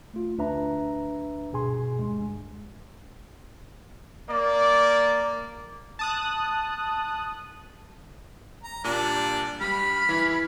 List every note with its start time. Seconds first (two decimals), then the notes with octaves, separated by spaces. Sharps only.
0.14 A3 F4
0.38 D2 D4 B4 E5 A#5
1.52 G2 B2 G#4 G#5 C6
1.99 D2 G2 G#3
4.29 A#3 D5
5.99 A5 D#6 F#6
8.64 A#5
8.84 A#2 G3 D4 D#7
9.61 G2 G3 B5 F6
10.09 E3 E4